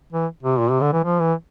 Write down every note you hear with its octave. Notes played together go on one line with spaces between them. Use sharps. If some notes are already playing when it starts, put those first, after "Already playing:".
E3
C3
A#2
C3
D3
E3
F3
E3